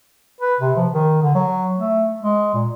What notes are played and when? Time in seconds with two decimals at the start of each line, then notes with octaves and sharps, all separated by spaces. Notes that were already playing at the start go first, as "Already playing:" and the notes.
0.41 B4
0.60 C3
0.77 F3
0.93 D#3
1.22 D3
1.35 F#3
1.78 A3
2.21 G#3
2.54 A#2